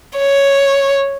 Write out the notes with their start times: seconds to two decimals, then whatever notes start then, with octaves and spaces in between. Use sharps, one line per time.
0.18 C#5